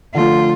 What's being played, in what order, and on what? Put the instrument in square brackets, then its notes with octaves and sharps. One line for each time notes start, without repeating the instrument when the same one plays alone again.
[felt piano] D3 F3 A3 [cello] F4